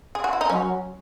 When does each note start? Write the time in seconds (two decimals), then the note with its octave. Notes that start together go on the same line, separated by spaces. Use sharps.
0.15 G#4
0.24 F#4
0.33 E4
0.41 D#4
0.50 F#3 C#4